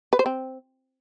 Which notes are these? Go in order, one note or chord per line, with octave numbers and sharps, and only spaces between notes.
B4
C5
C4